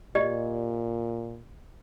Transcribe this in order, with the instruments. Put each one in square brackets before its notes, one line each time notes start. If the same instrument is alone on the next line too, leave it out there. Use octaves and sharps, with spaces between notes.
[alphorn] A#2 [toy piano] G4 D5 D#5